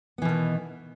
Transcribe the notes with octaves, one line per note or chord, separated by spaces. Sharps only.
B2 D#3 E3 B3